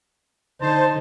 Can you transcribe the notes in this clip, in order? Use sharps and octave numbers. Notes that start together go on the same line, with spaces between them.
D3 D#4 C5 A5